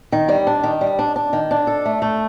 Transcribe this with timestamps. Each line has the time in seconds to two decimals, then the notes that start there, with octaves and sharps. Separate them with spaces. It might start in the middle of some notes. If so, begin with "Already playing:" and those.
0.12 D#3
0.29 G3
0.47 D4
0.63 D#3
0.81 G3
0.99 D4
1.16 D4
1.33 D#3
1.51 D4
1.67 A4
1.85 A3
2.02 A3